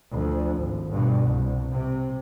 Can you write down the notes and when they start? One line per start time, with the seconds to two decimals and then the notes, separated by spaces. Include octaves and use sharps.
0.12 D2 F3
0.59 G#1
0.90 G2 B2
1.26 C2
1.72 C3